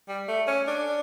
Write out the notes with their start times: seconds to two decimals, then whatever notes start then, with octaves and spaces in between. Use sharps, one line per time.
0.08 G3
0.28 A3
0.47 C#4
0.67 D4